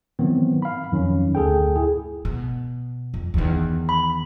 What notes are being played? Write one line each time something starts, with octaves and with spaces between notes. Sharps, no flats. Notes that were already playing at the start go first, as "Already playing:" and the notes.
D#3 E3 F#3 B3 C4
F5 B5
F2 D#3 F#3 C#4 D#4
D2 G#4 A4 G5
E4 G#4
B2
F2
E2 D#3
B5